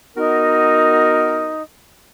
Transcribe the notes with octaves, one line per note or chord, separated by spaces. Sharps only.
B3 D#4 F#4 A#4